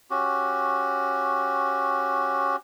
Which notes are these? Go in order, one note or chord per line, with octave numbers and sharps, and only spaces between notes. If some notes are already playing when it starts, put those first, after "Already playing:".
C#4 F#4 G4